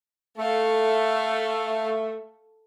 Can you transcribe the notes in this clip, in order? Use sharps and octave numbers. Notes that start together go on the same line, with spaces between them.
A3 A4 F5